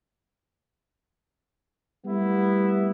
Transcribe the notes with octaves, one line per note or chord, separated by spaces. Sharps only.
G3 A3 B3 E4